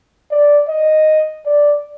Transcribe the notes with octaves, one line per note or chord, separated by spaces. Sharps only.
D5
D#5
D5